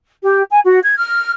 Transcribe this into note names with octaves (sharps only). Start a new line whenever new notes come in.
G4
G#5
F#4
G#6
F6